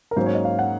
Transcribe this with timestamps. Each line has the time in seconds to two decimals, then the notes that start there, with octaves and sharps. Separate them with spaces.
0.11 A#4
0.16 G#2 F#3 A#3 C#4 C5
0.26 C#5
0.35 D#5
0.45 F5
0.59 F#5